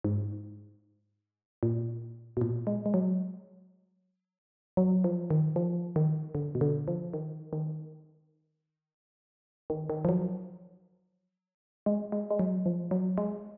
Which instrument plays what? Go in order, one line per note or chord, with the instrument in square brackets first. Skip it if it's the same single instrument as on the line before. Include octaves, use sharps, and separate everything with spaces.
[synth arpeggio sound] G#2
A#2
B2
A#2
G#3
G#3
F#3
F#3
F3
D#3
F3
D#3
D3
B2
D3
F3
D#3
D#3
D#3
D#3
F3
F#3
G#3
G#3
G#3
F#3
F3
F#3
G#3